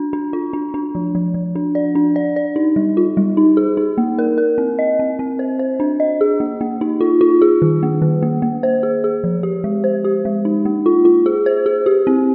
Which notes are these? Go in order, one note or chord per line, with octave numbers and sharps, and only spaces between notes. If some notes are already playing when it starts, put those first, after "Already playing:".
Already playing: D4
D4
F4
D4
D4
F3
F3
F3
D4
D5
D4
D5
D5
D#4
G3
F4
G3
D#4
G#4
D#4
A#3
A#4
A#4
C4
D#5
C4
C4
C5
C5
D4
D#5
G#4
A#3
A#3
D#4
F4
F4
G#4
D#3
A#3
D#3
A#3
A#3
C5
G#4
G#4
F3
G4
G#3
C5
G4
G#3
D#4
A#3
F4
F4
G#4
C5
G#4
G4
C4